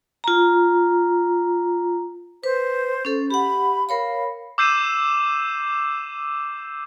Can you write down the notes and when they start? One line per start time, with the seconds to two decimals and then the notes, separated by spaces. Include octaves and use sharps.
0.24 F4 A#5
2.44 B4 C5
3.05 C#4 A4
3.31 G4 F#5 B5
3.89 A#4 C#5 F5 B5
4.58 D6 E6 G6 C7 D#7 E7